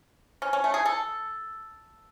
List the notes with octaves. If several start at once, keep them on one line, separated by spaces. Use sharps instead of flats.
C#4
C#4
A3
G#4
A4